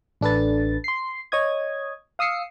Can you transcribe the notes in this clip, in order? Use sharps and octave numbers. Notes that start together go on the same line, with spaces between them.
A1 D4 A4 B4 A6
C6 C7
C#5 D#5 D#6 G#6
F5 D#6 E6 C7 C#7